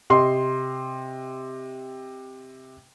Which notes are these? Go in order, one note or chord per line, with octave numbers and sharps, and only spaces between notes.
C3 D#5 C6